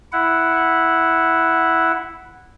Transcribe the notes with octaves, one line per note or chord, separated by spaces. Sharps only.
E4 F#5